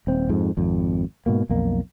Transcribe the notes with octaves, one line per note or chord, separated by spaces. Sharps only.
D#1 C4
F2 G#2
G#1 F2
G#2 B2 A#3
B1 F2 A#3